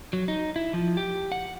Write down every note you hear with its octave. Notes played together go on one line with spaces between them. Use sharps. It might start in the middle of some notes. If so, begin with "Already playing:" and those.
F#3
D#4
E4
F3
G4
F#5